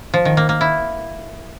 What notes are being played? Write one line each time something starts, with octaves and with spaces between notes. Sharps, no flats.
F3
D#3
A#3
A#3
E4